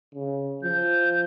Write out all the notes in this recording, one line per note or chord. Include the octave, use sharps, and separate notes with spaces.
C#3
F3 G6